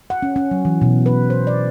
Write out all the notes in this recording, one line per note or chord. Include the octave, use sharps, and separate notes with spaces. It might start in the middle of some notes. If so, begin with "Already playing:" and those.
F#5
C#4
C#4
F#3
E3
B2
B4
C5
D5